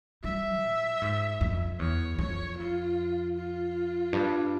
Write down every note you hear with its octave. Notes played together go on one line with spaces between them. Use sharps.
G3 E5
A#2
G#2
F2
E2 C#5
F2 C#5
F4
F4
G2